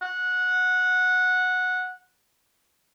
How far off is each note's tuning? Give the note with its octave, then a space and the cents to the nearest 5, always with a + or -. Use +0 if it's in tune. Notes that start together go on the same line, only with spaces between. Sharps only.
F#5 -15